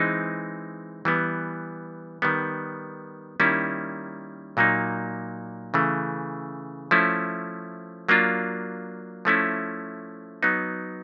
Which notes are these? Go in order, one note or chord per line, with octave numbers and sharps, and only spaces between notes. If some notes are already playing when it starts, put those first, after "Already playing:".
Already playing: E3 G#3 C4 D#4
E3 G3 B3
D#3 G3 B3
D#3 G3 A#3 C#4 E4
A#2 F#3 A#3 D#4
C#3 E3 A3
F3 A3 C#4 E4
F#3 A#3 D4 F4
F3 A3 C#4 E4
F#3 B3 D#4